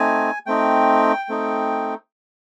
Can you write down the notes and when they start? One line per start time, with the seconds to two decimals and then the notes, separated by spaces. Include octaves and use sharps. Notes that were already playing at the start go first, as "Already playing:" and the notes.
Already playing: A3 C4 D#4 G#5
0.46 A3 C4 D#4 G5
1.29 A3 C4 D#4